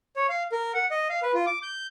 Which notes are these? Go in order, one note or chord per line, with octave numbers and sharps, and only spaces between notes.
C#5
F5
A#4
F#5
D#5
F5
B4
F4
D6
G6